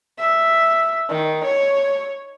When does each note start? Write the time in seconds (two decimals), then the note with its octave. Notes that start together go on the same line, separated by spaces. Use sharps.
0.19 E5
1.10 D#3
1.45 C#5